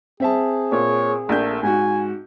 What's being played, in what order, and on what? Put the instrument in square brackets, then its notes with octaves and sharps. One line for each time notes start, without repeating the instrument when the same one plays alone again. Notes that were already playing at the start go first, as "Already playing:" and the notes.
[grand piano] C4 E5 A5 [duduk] G#4
[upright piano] A#2 [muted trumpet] C#5
[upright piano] A#1 A#3 G6 [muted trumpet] A3
[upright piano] G#2 F#4 [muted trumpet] G#5